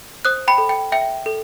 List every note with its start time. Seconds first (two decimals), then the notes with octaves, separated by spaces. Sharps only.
0.25 C5 D#6 F#6
0.48 G5 B5
0.58 A4
0.69 G5
0.92 E5 G5
1.26 A4